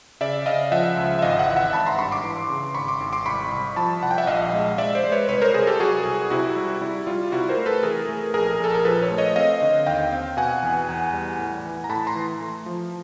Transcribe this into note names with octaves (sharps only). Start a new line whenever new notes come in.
C#3 D5 E5
C#3 D#5 F5
F3 E5 F#5
C#2
E5
G#1 D#5 F5
E5 F#5
E3
E5 F#5
G#1 A5 B5
A#5 C6
G2 B5 C#6
C6 D6
E3
C#3
G#1 B5 C#6
C6 D6
G#1
C6 D6
C2 B5 C#6
C2
F3 A5 B5
C2 F#5
G5
E5 F#5
A#1 D#5 F5
G#3
G#3 D5 E5
C5 D5
G#3
B4 C#5
C2 B4 C#5
A#4 C5
C2 G#4 A#4
G4 A4
F#3 F#4 G#4
C2
C3 E4 F#4
G3
G3 E4
G3 F4
C3 E4 F#4
A#4 C5
A3
A4 B4
E3 G#4 A#4
A3
A#1 G#4 A#4
A#1 A4
A#4
F3 A4 B4
B4 C#5
A3
C#5 D#5
C4 D#5 F5
D3
D#2 F5 G5
C4
B2 F#5 G#5
E2
E2
G3
A2
E3
A#5
A2 A5 B5
A#5 C6
E3
A3
F3